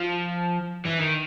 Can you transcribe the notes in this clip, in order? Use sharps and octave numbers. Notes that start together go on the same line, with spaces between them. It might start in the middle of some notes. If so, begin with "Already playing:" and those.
Already playing: F3
E3
D#3